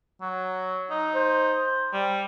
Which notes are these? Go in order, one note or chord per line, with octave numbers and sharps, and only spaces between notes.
F#3
D#4
C5
G3